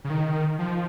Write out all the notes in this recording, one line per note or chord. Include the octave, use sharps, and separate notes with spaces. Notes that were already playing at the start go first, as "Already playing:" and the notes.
C#3
D#3
F3